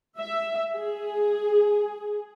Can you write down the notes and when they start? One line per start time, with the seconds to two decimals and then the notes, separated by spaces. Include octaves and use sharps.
0.18 E5
0.76 G#4